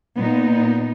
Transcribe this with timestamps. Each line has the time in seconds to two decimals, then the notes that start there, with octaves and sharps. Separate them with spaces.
0.16 A#2 B3 D#4